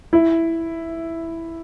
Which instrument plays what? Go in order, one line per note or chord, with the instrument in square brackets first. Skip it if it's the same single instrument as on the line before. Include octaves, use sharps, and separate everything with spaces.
[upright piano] E4